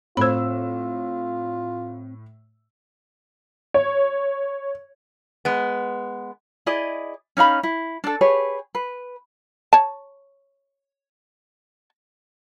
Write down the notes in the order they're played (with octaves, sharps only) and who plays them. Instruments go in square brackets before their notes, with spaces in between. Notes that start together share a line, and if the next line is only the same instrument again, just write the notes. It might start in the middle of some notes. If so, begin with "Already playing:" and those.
[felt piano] A2 E6 [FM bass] C4 [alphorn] F4 [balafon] C5 B5
[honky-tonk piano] C#5
[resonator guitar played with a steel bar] G#3 B3
[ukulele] E4 G#4 D5 D#5
C#4 D#4 F5 B5
E4
D4 A4
G4 G#4 B4 C#5
B4
[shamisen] C#5 A5